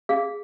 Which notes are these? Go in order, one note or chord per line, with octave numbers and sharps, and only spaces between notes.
G#4 F5